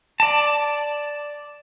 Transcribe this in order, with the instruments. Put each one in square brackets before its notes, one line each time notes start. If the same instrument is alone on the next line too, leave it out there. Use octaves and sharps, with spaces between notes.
[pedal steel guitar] D5 A5